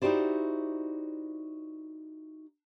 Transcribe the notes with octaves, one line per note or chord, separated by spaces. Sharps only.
D#4 E4 F#4 G4 C5 D5